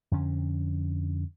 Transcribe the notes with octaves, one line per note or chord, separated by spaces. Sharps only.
F2 D3 C#4